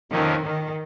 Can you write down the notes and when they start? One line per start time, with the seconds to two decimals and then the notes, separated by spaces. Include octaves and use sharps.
0.12 F2 C3 D#3 F3 A#3 C#4
0.45 D#3